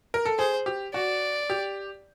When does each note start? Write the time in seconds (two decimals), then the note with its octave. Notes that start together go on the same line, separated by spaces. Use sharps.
0.14 A#4
0.25 A4
0.39 G#4 C5
0.66 G4
0.94 F#4 D5
1.50 G4